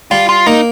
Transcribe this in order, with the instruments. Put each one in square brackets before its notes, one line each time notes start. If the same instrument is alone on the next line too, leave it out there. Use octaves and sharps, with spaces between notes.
[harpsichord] G3 [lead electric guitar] F4
[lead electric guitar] F4
[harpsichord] A#3 [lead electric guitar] D#4